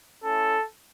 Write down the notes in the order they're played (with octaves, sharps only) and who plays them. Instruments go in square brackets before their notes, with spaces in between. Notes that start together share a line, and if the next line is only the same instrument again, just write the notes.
[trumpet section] A3 C#4 E4 A4